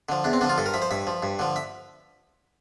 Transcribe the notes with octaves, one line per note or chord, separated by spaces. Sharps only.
D3 F3
E2 D4
C4
D3 F3 D4
F4
G2 A4
A#4
F3 E5
C5
G2 E5
F3
G2
D3 F3
E5